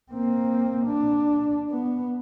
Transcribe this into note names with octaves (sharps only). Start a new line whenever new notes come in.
A#3 C4
D4
B3